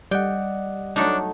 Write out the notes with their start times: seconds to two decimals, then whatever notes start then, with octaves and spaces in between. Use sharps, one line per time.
0.11 G3 D5 D#5 F#5 G5
0.96 F#3 A3 D4 D#4